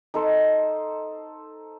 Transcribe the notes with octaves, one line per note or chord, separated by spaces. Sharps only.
D#4 A4 C5